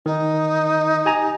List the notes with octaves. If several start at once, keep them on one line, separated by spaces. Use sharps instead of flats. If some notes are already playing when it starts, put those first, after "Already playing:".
D#3 D#4
G4 G#5 A#5